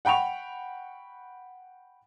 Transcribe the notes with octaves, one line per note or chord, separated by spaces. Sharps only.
F#5 G5 B5 C#6 F7